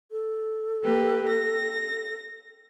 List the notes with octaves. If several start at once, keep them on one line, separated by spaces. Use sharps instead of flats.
A4
A#3 G4 B4
A#6